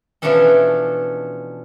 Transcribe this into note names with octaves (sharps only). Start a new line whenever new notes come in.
B2 E3 F3 C#4 D4 A4